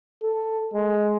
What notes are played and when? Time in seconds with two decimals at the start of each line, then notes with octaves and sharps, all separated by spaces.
0.23 A4
0.74 G#3